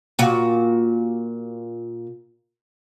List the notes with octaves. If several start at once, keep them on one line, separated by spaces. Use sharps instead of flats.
A#2 F#4